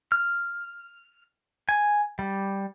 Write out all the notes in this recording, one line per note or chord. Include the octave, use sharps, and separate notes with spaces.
F6
G#5
G3